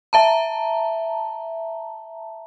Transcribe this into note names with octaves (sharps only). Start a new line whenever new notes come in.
E5 A5 A#5